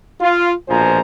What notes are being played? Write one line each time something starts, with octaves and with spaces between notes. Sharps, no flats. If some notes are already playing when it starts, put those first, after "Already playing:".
F4
A#1 B2 F3 G#4 C5 A#5